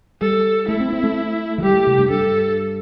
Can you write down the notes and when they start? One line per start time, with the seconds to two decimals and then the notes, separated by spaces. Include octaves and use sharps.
0.21 G3 A4
0.68 A3 E4
0.80 C4
0.93 C4
1.04 A3
1.58 E3
1.63 G3 G4
1.74 A3
1.87 C3
1.99 G2
2.10 G2 A4